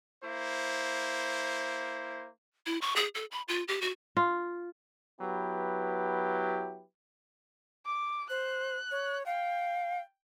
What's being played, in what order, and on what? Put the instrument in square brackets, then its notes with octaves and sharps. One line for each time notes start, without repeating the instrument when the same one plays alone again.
[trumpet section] A#3 E4 C5
[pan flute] E4
C#6
G#4
A4
B5
F4
G4
F#4
[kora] F4
[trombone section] F#3 B3 E4 G4 B4
[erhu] D6
[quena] C5 [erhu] F#6
[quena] C#5
[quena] F5 [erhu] G5